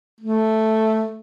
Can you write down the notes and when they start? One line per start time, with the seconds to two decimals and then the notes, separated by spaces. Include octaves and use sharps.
0.21 A3